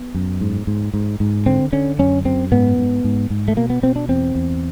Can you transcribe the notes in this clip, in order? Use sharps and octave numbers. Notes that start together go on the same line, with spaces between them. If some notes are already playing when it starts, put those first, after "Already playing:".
Already playing: B3
F#2
G#2
G#2
G#2
G#2
D3 C4
D3 C#4
F#2 C#4
F#2 C4
G#2 B3
G#2
G#2
G#2
A3
B2 A#3
B3
B2 C4
D4
E2 C4
E2